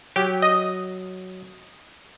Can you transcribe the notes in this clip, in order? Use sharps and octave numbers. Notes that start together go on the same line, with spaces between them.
F#3 G4
D#5